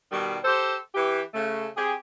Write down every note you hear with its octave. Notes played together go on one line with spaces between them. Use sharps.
B2 D#3 G3
G4 A4 C5
E3 G4
C#3 A3
C4 G4 G#4